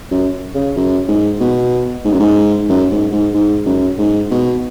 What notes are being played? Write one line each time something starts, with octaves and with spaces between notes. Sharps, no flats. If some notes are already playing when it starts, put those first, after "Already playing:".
F#2
C#3
F#2
G#2
B2
G#2
F#2
G#2
F#2
G#2
G#2
G#2
F#2
G#2
B2